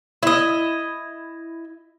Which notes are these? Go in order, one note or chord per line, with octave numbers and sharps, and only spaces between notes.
E4 D#5